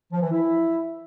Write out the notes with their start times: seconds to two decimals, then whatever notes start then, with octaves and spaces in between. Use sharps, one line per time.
0.12 F3
0.22 E3
0.31 E4